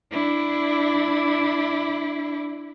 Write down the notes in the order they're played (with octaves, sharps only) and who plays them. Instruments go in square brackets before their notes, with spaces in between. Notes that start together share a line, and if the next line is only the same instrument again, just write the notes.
[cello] D4 E4